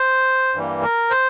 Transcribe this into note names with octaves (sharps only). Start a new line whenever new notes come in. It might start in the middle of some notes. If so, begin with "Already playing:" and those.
Already playing: C5
G2 E3 G3 A#3
A#4
C5